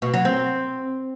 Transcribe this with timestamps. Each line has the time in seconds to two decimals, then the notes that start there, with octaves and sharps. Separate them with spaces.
0.02 B2
0.14 F#3
0.25 C4